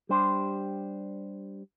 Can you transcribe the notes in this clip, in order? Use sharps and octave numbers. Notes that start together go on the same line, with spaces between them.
G3 D4 G4 C5